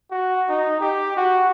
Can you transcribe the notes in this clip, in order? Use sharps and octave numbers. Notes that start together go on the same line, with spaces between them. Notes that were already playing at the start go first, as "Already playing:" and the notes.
F#4
D#4
G4
F#4